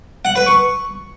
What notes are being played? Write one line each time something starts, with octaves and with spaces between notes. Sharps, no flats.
F#5
B4
C#6